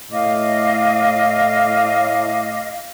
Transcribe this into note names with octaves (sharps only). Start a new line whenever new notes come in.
A2 D#5 F5 D6